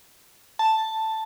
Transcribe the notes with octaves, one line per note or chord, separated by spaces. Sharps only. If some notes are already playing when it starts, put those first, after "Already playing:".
A5